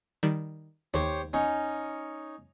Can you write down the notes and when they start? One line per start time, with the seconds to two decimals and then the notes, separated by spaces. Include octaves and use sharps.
0.23 D#3 G3
0.94 D#2 G4 C5 C#5
1.33 C#4 D#4